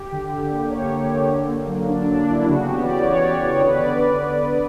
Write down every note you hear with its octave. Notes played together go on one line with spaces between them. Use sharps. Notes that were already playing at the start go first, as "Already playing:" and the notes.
Already playing: G4
D3
D3
A#3
A#3 C#5
D3
D3
D3
A#3
F#3
D3 D4
D3 D4
D4
A#3 E4
C#3 F#4
B3 G4
E3 D5
C#3 C#5
D5
C#3
D5
B3 C#5
D3 B4
D5